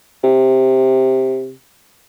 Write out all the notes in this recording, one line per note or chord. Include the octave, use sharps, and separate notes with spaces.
C3